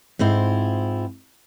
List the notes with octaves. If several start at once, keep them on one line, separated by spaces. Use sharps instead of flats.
G#2 C4 E4 F4